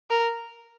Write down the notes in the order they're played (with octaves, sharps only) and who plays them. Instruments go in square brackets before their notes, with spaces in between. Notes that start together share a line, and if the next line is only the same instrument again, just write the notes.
[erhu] A#4